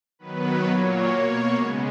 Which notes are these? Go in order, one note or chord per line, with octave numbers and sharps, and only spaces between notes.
D#3 F#3 B3 B4
A#2 F#3 A#3 C#5
B2 A#3 C#5
C#3 G#3 B3